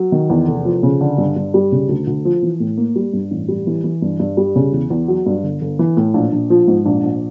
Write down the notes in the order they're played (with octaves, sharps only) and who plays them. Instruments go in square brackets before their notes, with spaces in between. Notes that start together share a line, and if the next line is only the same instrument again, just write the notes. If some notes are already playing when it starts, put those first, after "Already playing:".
Already playing: [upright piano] F#3
D#3
E2
F1
F3
C#3
D3
G2
G2
G3
C#3
D2
D2
F3
E3
A2
A#3
G3
G2
A1
G3
E3
E3
G2
G2
G3
C#3
E2
E2
F#3
G2
G1
G1
E3
A2
A#1
A#1
F3
G#2
A#1
A#1